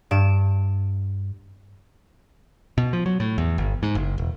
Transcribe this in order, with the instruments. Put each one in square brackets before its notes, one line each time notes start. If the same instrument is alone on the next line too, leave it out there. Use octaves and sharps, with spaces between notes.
[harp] G2 D7 E7
[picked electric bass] B2
F3
F#3
A2
E2
G1
G#2
F#1
E1